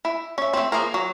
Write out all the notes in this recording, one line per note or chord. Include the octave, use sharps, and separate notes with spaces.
E4
C#4 E5
A3 C4
F3 A#3 G#4 A#4
F#3